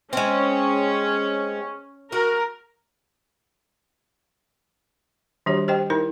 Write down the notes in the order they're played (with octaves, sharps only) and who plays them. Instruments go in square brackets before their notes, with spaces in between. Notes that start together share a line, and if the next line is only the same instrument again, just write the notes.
[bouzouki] G#3 C4 [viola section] C#4
[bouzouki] F#4 [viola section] A#4
[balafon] D#3 G3 D4 F#4 G4 C#5
G4 C5 D#5 G5
D#4 E4 A#4